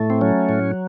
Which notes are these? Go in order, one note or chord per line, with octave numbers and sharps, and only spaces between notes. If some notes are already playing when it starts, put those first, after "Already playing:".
Already playing: A2 A3
C4
F#3 C#4
A2